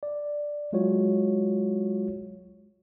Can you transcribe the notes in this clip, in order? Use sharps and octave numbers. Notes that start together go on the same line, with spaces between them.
D5
F#3 G#3 F4 F#4 C#5